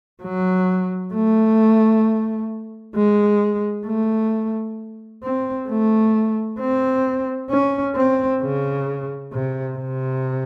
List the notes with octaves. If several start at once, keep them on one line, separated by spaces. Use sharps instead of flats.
F#3
A3
G#3
A3
C4
A3
C4
C#4
C4
C#3
C3
C3